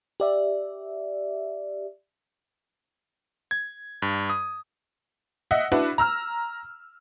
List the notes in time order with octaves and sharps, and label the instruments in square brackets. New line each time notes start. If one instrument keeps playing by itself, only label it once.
[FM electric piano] G4 D5 E5
[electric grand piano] G#6
G2
D#6
[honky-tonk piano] D#5 E5 F#5
D4 E4 F#4 B4
A#5 E6 F6